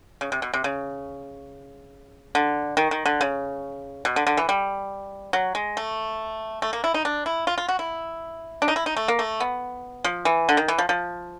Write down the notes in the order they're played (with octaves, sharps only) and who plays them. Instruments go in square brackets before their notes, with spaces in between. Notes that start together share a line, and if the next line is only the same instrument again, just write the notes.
[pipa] C#3
C3
B2
C3
C#3
D3
D#3
D#3
D3
C#3
B2
D3
D3
E3
G3
F#3
G#3
A3
A3
A#3
E4
D#4
D4
E4
F4
F4
F#4
E4
D4
D#4
E4
D#4
A3
A#3
A3
B3
F3
E3
D3
D#3
E3
F3
F3